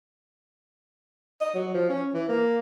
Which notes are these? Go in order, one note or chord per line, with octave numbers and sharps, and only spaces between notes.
D#5
F#3
F3
C#4
E3
A#3